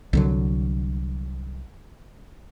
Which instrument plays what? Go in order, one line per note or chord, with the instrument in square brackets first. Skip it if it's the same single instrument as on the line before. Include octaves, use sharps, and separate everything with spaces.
[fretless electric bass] C2 D3 F#3